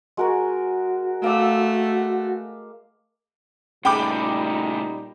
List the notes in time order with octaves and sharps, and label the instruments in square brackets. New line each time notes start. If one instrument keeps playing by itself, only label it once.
[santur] G#3 A#4 G#5 [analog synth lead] F#4
[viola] A3 [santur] F5 D6 E6
[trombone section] A#2 G3 D#4 [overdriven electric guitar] C#3 A3 [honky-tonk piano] G5 B5 D6